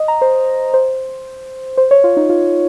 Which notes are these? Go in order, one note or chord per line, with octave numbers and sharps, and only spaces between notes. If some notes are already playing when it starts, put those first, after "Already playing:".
Already playing: D#5
A#5
C5
C5
C5
C#5
F4
D#4
F4